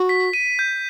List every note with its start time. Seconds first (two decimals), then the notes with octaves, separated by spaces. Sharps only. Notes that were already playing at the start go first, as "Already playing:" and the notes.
Already playing: F#4
0.09 B6
0.33 D#7
0.59 G6